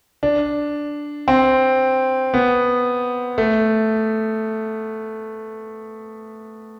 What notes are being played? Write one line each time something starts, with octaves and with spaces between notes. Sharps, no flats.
D4
C4
B3
A3